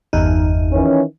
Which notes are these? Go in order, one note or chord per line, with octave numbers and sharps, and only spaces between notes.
G1 E2 D#4
D#3 E3 C#4